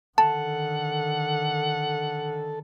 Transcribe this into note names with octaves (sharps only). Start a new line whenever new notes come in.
D3 D#3 A4 F#5 A5